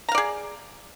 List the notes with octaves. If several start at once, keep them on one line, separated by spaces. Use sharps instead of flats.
G#4 D5 F5 A#5